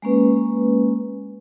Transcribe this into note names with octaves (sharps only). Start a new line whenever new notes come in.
G#3 A#3 C#4 B4